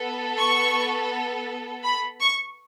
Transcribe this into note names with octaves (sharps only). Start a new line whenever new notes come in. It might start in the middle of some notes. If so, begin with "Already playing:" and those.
Already playing: B3 A4
C#6
B5
C#6